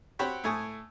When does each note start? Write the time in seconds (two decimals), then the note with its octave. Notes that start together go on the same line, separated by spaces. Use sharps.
0.19 C4 F#4 G4 C#5 B5
0.44 A2 A3 G#5 C#6 D#6